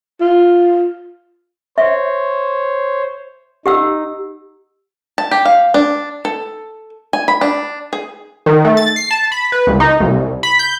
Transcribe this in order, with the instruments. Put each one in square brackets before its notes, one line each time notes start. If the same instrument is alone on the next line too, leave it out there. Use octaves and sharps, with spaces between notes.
[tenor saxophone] F4
[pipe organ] C5 C#5 [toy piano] E5
[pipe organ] D#4 [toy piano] G4 F#5 E6
[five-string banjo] A5
G4
F5
D4
A4
G#5
B5
D4
G#4
[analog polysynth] D#3
A3
A6
C7
A5
B5
B4
C#2
D#4
C2
B5
G6